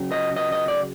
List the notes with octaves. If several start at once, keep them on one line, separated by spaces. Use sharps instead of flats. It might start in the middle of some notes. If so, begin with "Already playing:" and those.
Already playing: C#3 F#3
D#5
D#5
D#5
D5